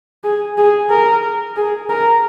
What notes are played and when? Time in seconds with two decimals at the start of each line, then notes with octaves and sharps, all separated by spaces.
0.24 G#4
0.57 G#4
0.90 A#4
1.57 G#4
1.90 A#4